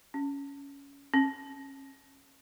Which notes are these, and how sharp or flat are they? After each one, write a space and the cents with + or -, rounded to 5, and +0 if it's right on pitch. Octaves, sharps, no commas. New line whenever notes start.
C#4 +15
C#4 -25